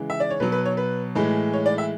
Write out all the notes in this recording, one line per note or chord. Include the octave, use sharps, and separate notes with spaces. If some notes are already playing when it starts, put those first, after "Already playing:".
Already playing: C#3 E3 G#3
E5
D5
C#5
B2 F#3 B4
B4
C#5
B4
A2 E3 G#3
C#5
D5
E5